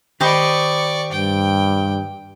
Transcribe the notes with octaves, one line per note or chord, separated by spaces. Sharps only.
D#3 G4 C5 D5 D#5 B5 C#6
G2 G5